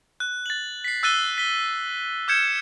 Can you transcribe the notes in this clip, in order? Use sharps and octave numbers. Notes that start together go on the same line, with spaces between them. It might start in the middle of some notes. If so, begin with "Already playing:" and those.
F#6
A6 F#7
B6 C7
E6 F#6 A6 D#7 G7
B6 G7
D6 F6 G6 G#6 C#7 E7